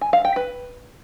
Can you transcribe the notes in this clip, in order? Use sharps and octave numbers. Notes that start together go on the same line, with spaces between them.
G#5
F5
G5
B4